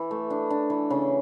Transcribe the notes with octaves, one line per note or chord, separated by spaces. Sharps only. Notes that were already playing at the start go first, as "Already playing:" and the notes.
Already playing: E3
A3
D4
D4
E3
C#3